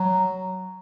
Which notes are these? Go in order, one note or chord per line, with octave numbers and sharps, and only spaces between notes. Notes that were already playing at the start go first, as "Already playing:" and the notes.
Already playing: F#3